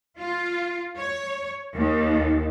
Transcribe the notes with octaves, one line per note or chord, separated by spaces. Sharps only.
F4
C#5
D#2